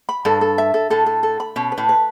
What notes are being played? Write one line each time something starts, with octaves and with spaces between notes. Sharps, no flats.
B5
G2 A4
A4
E5
A4
A2 A4
A4
A4
B5
B2 C#4
B4
A2
B4